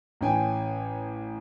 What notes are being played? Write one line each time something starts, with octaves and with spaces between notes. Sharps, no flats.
A1 C#4 G5 G#5